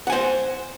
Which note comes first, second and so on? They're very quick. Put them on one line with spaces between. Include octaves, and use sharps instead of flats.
F#5 G#5 C5